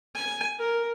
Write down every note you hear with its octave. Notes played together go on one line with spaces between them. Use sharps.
G#5
A#4